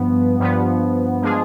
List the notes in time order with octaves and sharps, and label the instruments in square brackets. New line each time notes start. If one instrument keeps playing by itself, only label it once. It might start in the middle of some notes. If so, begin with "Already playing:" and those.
Already playing: [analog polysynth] G2 F3 B3
G2 F3 B3
F3 G#3 D4 F4 G#4